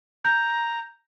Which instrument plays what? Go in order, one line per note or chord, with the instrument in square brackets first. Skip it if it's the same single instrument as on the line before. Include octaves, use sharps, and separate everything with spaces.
[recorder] A#5 [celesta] G6